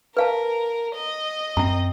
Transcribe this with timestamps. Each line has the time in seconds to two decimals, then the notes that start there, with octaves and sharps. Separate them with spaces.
0.17 A#4 B4 F5 A5
0.95 D#5
1.57 F#2 C4 A#5